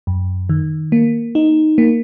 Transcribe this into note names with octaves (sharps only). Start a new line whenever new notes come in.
F#2
D#3
A#3
D#4
A#3